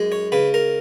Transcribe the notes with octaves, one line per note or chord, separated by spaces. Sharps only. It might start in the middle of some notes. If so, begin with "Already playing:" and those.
Already playing: F#2 G#3
C#5
C#3 B4
A#4